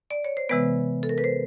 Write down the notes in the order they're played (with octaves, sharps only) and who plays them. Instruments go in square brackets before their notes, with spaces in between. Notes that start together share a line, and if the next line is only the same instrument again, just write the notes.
[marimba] D5
C#5
C5
C3 E3 G#3 B3 B4
A4
A#4
B4
C5